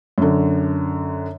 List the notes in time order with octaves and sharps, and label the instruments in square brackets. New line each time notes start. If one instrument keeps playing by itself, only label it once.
[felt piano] F#2 D3